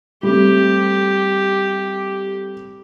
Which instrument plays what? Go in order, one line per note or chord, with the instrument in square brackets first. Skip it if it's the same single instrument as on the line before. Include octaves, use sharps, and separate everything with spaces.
[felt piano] G3 A3 C4 [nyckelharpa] G4